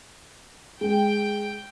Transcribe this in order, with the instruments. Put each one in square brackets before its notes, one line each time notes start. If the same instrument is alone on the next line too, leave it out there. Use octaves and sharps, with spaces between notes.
[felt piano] G#3 [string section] G5